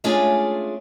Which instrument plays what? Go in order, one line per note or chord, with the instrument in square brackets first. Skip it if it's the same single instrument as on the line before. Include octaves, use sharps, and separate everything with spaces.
[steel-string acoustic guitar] G#3 A3 C#4 D4 F4 G#4